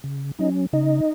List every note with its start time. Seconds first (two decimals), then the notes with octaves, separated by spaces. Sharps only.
0.04 C#3
0.39 F#3 C#4 D#4 D#5
0.73 C#3 D#4 D#5